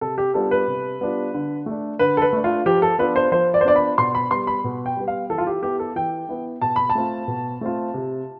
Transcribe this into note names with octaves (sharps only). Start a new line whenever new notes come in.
C3 A4
G4
G3 B3 D4 F4 A4
B4
C3
G3 B3 D4 F4
D3
A3 D4
D3 B4
A4
B4
A3 D4
F4
F3 G4
A4
B3 D4 F4 B4
C5
F3 C5
D5
C5
B3 D4 F4 D5
B5
B2 C6
B5
G3 B3 C6
B5
B2
G5
G3 B3
F5
E3 A4
F4
G4
B3 E4 G4
A4
E3 G5
B3 E4
B2 A5
B5
A5
A3 C4 F4
B2
A3 C4 F4
C3